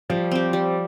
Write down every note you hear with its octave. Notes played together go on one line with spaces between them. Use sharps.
F3 G3
C4 G4
G3